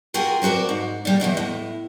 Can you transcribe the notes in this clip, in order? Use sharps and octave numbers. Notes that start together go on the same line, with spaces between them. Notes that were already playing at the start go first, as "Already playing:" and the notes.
F4 F#4 G#4 A#4 G5 G#5
F#3 C4 F#4 A#4 D5
G#2
A#2 G3
E2 D#3 F#3 D#5
A2